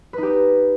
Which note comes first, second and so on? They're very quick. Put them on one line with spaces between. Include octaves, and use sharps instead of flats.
B4 D#4 G4